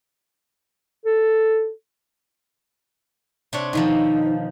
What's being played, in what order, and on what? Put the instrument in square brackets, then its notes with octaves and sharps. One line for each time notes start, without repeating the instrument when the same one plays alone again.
[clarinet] A4
[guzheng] C3 D4 C#5
[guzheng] B2 D#3 F3 [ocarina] D#4